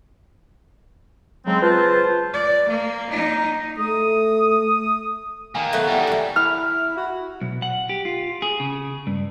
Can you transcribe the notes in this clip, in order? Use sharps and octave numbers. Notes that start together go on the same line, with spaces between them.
C#3 F#3 G#3 C4
C#2 F4 B4 C5 A5
D5
A#3
D#4
A3 D#6
D#3 A#3 G#5 A#5
F#3 A3 B3 F#5
E2 G3 A3
A#2 F#4
E4 F6
F#4
B1
F#5
G4
F4
G#4
C#3
G2